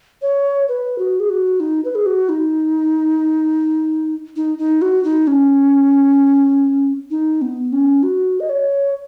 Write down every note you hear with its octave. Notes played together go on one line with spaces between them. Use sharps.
C#5
B4
F#4
G#4
F#4
D#4
B4
G#4
F#4
D#4
D#4
D#4
F#4
D#4
C#4
D#4
B3
C#4
F#4
D#5
C#5